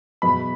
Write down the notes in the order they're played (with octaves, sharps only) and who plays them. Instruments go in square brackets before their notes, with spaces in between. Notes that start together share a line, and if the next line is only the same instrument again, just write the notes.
[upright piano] E2 B2 F#3 B3 [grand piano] B5